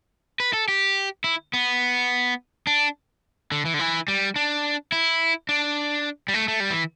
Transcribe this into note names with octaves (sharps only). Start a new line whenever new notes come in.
B4
A4
G4
E4
B3
D4
D3
E3
D3
E3
G3
D4
E4
D4
G3
A3
A3
G3
E3